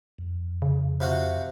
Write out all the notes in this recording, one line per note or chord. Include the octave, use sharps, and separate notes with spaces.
F2
C#3
C3 F4 F#4